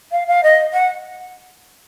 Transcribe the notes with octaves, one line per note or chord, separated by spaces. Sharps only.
F5
F5
D#5
F#5